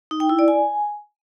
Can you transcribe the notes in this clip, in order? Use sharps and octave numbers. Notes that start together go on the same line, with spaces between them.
D#4
G5
E4
D5
G#5